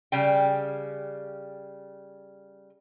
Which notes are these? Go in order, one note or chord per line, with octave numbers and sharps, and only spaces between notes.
C#3 G3 G5